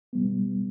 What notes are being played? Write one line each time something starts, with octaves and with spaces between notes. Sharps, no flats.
B2 G3 B3